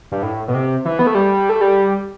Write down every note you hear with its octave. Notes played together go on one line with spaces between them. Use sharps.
G2
A2
B2
C3
E3
B3
A3
G3
A3
G3